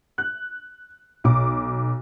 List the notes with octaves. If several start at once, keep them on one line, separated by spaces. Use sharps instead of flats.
F#6
B1 D6